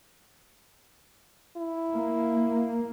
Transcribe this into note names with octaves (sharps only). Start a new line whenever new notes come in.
E4
A#3